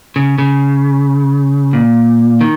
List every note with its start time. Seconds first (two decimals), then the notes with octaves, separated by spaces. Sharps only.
0.16 C#3
0.38 C#3
1.73 A#2
2.41 D#3